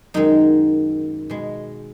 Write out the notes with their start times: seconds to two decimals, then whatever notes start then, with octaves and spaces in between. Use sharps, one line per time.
0.14 F#2 D#3 G#3 D#4
1.30 B2 G#3